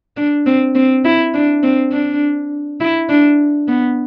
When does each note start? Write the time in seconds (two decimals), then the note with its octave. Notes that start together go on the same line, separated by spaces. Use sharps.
0.17 D4
0.46 C4
0.75 C4
1.05 E4
1.34 D4
1.63 C4
1.92 D4
2.80 E4
3.09 D4
3.68 B3